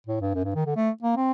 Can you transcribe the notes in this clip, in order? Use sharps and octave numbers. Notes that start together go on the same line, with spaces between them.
A2
G2
F#2
G2
D#3
D3
A3
A#3
C4